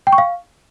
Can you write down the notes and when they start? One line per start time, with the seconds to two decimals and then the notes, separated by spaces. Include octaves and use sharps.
0.07 G5
0.13 C#6
0.18 F5